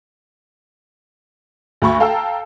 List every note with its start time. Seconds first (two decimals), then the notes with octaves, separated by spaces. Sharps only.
1.82 D2 F#4 B5 C#6
2.00 A4 F5 G5 A5 A#5 E6